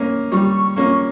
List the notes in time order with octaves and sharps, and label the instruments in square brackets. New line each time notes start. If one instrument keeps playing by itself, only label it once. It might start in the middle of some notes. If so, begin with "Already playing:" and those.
Already playing: [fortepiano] A#3 C#4
[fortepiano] G3 [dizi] C#6
[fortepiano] A#3 C#4